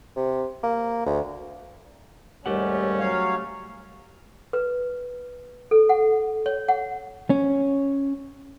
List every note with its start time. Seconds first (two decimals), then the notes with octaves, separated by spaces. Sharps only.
0.16 C3
0.63 A#3
1.06 D2
2.46 D#2 G#2 G3 A3 C#4 G4 F#5
3.00 F#3 C#5 F5
4.53 B4
5.71 A4
5.89 F#5
6.46 C#5
6.68 F#5
7.30 C#4